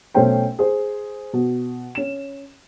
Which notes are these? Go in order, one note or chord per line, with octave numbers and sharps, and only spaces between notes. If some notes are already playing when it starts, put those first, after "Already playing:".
B1 A3 C#4 C5 G5
G#4 C5
B2
C#4 E7